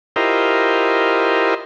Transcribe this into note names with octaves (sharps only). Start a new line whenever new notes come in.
E4 F4 G4 A#4 C5 D#5